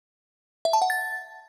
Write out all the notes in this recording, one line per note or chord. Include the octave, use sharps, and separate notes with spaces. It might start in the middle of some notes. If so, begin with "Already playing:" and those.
E5
A5
F#5
A6